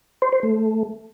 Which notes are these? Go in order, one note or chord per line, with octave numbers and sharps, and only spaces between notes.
C5
C5
A3